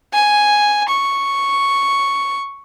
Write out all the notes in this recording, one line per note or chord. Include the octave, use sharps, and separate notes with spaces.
G#5
C#6